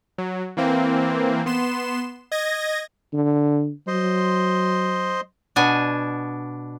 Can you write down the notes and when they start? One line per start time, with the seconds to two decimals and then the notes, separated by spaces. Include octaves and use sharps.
0.18 F#3
0.57 E3 A#3 C4
1.46 B3 C6 E7
2.32 D#5 G#6 A#6
3.13 D3
3.88 F#3 C5 D#5 C6
5.56 B2 D4 G#5